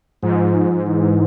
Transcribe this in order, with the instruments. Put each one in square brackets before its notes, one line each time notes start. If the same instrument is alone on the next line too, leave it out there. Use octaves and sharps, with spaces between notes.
[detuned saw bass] G#2 [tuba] F3
[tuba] E3